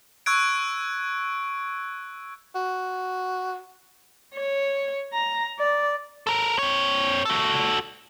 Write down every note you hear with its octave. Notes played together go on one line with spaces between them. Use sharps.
C#6 E6 F#6 G#6 D7
F#4
C#5
A#5
D5
A4 A#4
C4 C#5
F#4 A4